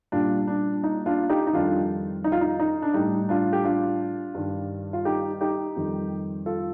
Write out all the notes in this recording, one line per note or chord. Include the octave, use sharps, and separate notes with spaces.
A#2 G3 D4 F4
D4
D#4
D4 F4
D#4 G4
D#4
F2 D#3 G3 D4 F4
D#4
F4
D#4
D#4
D4
A2 G3 D#4
D4 F4
G4
D4 F4
G2 D#3 G3
F4
D#4 G4
D#4 G4
F2 D#3 G3
F4 A4